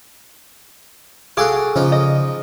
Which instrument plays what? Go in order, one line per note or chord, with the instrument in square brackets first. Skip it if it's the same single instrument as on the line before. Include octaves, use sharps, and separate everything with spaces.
[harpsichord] F#4 A4 F5 [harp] G#4 D6
[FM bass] C#3 [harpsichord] F3 D#4
[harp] D#5